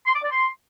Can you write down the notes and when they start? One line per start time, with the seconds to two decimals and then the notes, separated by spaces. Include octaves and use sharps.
0.06 C6
0.14 D6
0.23 D5
0.31 C6